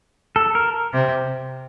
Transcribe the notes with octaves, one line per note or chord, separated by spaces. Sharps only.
A4
A#4
C3